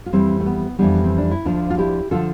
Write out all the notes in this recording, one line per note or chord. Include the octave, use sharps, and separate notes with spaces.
F4
F2 E3 G3 C4 E4
A3
B3
F2 E3 G3 B3 D4
C4
D4
E4
D2 D3 F3 D4 F4
F4
E4 G4
D3 F3 F4 A4